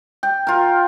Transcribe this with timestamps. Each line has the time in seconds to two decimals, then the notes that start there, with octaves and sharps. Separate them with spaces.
0.23 G5
0.47 F4 A#4